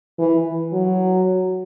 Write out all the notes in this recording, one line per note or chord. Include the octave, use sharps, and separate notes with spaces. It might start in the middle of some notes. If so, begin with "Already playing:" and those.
E3
F#3